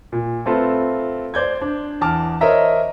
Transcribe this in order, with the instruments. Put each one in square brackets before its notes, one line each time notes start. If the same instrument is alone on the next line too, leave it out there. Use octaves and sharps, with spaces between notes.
[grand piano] A#2
A3 C4 F4 A4 B4
C5 D5 G6 G#6
D4
E2 A5 D6 F6
A#4 C5 C#5 D#5 E5 A#5